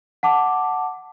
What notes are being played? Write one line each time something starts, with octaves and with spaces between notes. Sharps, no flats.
F#5 A5 D6